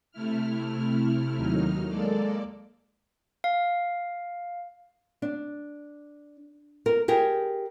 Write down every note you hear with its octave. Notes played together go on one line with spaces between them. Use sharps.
C3 A3 E4 F6
D#2 F#3 D#4 F6
G#3 A#3 A4 D5
F5
D4
A#4
G4 G#4 A#4